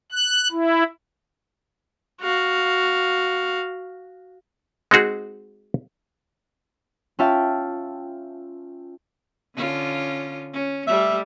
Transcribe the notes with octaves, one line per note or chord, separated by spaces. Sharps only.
F#6
E4
F#4 F5
G#3 C4 D#4 F#4 G#4
C#4 F4 E5 F5 G5 A5
D3 C#4 F4
C#4
G3 A3 E5